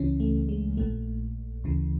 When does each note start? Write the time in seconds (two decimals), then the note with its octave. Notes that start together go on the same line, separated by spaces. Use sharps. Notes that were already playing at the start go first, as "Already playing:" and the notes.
Already playing: C#2 C#3 E3 C#4
0.20 A3
0.49 G#3
0.77 A#1 A#2 A3
1.64 D2 C#3 E3